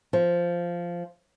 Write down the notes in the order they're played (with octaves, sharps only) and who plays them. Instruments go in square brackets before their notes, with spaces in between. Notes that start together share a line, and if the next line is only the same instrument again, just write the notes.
[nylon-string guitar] F3